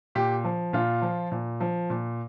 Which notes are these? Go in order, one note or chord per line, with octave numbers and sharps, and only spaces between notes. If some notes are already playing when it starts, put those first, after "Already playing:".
A#2 G4
F3
A#2 F4
F3
A#2
F3
A#2